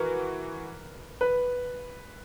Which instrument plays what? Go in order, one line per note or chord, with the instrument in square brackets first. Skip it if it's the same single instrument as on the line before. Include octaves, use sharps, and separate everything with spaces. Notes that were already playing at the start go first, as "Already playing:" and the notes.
Already playing: [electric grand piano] E3 F#4 [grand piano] A#4 B4
[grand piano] B4